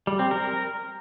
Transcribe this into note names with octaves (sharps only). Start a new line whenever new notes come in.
G3
C4
A#4